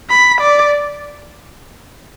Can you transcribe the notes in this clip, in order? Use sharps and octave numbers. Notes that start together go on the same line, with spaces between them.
B5
D5